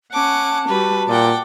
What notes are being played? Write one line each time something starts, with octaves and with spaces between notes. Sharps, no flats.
C#4 F#5 A5 D6
G3 F#4 B4
A#2 D5 F#5 G5 D6